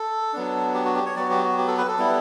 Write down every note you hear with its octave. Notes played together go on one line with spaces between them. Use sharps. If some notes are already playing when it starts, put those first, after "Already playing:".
Already playing: A4
F#3 B3 D4
G4
F#4
G4
C#5
F#3 B3 F#4 D5
G4
F#4
G4
A4
B4
A4
G3 B3 E4